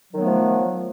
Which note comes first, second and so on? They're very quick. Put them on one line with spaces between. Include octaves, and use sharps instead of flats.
F#3 D#3 B3 A3 F3